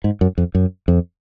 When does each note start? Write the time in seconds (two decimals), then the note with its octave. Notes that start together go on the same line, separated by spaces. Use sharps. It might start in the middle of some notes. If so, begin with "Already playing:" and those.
0.04 G#2
0.21 F#2
0.38 F2
0.55 F#2
0.88 F2